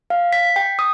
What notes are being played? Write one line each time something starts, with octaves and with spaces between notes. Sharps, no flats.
F5
B6
G5
D#6